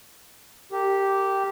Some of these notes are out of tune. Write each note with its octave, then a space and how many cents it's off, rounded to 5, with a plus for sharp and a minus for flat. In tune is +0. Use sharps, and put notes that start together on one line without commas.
G4 -5 A#4 -30